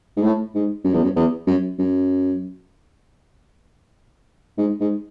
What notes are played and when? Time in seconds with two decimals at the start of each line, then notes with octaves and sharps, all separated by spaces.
0.17 G#2
0.23 A2
0.55 G#2
0.85 F#2
0.94 E2
1.03 F#2
1.16 E2
1.47 F#2
1.79 F#2
4.58 G#2
4.81 G#2